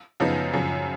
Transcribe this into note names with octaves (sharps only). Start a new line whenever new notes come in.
F#2 C#3 F3 B3 D#4
F#2 C#3 F3